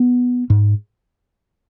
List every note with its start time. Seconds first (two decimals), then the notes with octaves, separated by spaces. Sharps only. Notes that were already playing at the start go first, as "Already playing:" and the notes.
Already playing: B3
0.50 G#2